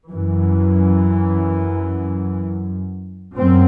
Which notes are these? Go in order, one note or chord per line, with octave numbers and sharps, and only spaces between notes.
F#2 E3
F#2 C4